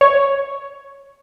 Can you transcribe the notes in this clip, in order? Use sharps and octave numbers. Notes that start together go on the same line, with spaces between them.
C#5